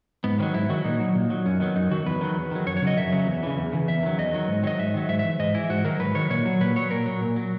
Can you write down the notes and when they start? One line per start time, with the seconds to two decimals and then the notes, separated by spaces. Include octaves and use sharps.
0.24 G#2 B3
0.39 D#3 C#4
0.43 F#3
0.54 G#2 E4
0.69 D#3 F#3 F#4
0.85 A#2 D#4
1.00 F#3
1.15 A#2
1.30 F#3
1.45 F#2 C#4
1.60 D#3 F#3 B3
1.76 F#2 D#4
1.91 D#3 F#3 F#4
2.06 E2 B4
2.21 D#3 F#3
2.36 E2
2.51 D#3 F#3
2.66 F#2 C#5
2.76 C#5
2.82 C#3 F#3 D#5
2.97 F#2 E5
3.12 C#3 F#3
3.27 E2
3.43 C#3 E3
3.58 E2
3.73 C#3 E3
3.88 E2 E5
4.03 D#3 F#3
4.18 E2 D#5
4.33 D#3 F#3
4.48 G#2
4.63 D#3 F#3 D#5
4.79 G#2 E5
4.94 D#3 F#3
5.09 G#2 E5
5.19 E5
5.25 E3
5.39 G#2 D#5
5.55 E3 E4
5.70 G#2 F#4
5.85 D#3 F#3 A#4
6.00 G#2 B4
6.15 D#3 F#3 C#5
6.30 A#2 C#5
6.45 F#3
6.61 A#2 B4
6.76 F#3 C#5
6.91 A#2 A#4
7.06 F#3
7.21 A#2
7.36 F#3